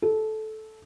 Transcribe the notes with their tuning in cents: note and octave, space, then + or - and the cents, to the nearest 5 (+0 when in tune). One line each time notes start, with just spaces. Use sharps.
A4 -15